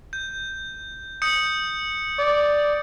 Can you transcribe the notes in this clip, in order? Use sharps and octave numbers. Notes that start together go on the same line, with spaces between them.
G6
D#6 G6 C#7
D5